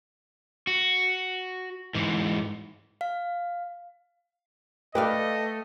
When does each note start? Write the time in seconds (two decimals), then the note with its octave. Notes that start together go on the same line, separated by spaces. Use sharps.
0.67 F#4
1.95 G#2 E3
3.01 F5
4.95 A3 B4 D5 D#5 F5 G5